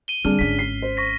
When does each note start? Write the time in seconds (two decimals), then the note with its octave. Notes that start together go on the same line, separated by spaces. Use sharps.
0.08 D#7 G7
0.25 D3 G3 C4 D4 G#4 F6
0.39 G#1 C#4 B6
0.59 C7
0.82 C5
0.97 C#6 A#6 B6